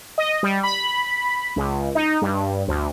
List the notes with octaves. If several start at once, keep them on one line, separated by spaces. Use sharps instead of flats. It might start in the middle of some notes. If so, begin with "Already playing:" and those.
D#5
G3
B5
C#2
D#4
G2
D2